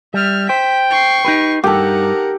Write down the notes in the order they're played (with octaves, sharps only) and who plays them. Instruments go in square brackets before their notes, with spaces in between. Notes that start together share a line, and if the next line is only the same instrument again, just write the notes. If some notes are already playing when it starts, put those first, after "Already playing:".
[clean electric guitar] G3 [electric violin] E5 F6
[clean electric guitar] C5 [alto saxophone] G5 [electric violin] B6
[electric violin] C#6 C7
[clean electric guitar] D#4 G4 B4
[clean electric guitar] G2 [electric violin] D#4 F#5 [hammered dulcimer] G4 A4 [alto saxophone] A#4